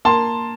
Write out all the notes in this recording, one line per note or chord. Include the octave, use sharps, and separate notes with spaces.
A#3 A5 C6